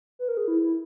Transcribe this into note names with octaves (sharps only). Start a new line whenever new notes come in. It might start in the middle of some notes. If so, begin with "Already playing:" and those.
B4
A#4
G#4
E4
E4